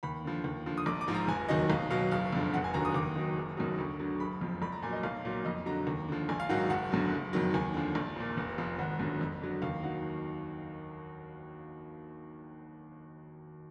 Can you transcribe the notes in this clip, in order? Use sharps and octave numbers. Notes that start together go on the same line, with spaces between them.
D#2 B5
D3 F3
D#2
D3 F3
D#6
A#1 D6
D6
G#2 F3
A#5
F1 G#5
D#2 D#3 F#3 D#5
B1 F5
B2 F#3 F5
F#1 F5
F2 D3 F3
F1 F#5
G#5
D#2 D3 F#3 A#5
D#6
D#2 D6
D#3 F#3
F#1
F#2 D#3 F#3
D2
D3 F#3
F#1 B5
F2 F3
A#1 B5
A#5
A#2 F#3 G#5
D#5
B1 F5
A#2 F#3
F2 D#5
D3 F#3 A#5
D#2
D3 F3
A#1 G#5
F5
G#2 D#3 F#3 F#5
F#1 F#5
F#2 D3 F#3
F#1
F2 D#3 F#3
D#2 G#5
D3 F3
A#1
A#2 F3
F1
F2 F3
G#1 F#5
F#2 D3 F#3
F2
D3 F#3
D#2 F5
D#3 F#3 F#5